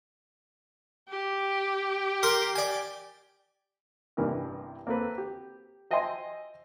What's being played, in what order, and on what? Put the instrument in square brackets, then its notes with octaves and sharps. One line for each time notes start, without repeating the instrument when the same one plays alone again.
[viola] G4
[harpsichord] A#4 C6
D5 G#5
[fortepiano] A1 G2 C3 E3 A#4 F6
A#3 C4 A4 B4
G4
C5 D#5 E5 G5 G#5 C6